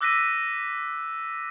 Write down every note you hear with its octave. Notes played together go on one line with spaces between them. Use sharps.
D6 E6 F#6 A#6 B6 D#7